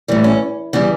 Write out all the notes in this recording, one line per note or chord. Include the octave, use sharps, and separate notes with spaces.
A2 E3 G3
C#4
C#3 E3 G3 B3